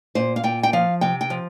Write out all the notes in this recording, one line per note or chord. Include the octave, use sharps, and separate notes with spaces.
A#2 C5
F5
A#2 G5
G5
F3 F5
C3 G5
G5
F3